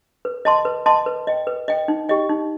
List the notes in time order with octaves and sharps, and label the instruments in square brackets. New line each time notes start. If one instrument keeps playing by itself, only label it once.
[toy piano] B4
D#5 A5 C6
B4
D#5 A5 C6
B4
D#5 G5
B4
D#5 G5
D#4
G4 D#5 G5
D#4